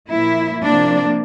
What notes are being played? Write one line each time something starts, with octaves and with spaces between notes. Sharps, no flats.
A#2 F3 A#3 E4
C3 F3 A#3 D4